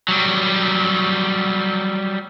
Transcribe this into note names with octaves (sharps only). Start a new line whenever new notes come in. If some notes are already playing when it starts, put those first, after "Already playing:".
F#3 G3